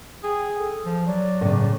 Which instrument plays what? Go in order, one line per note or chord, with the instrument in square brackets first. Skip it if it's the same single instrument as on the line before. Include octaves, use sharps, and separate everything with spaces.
[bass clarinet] G#4 [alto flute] G5
[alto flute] A4
[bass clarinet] F3
[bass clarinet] F#3 [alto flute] D5
[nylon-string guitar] A2 C#3